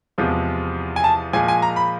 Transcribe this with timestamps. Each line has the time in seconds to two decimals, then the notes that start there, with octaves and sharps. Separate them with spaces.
0.18 E2 C3 F3 G#3
0.96 G#5
1.04 A5
1.33 A#2 F3 G#3 G#5
1.48 G#5
1.62 A#5
1.76 B5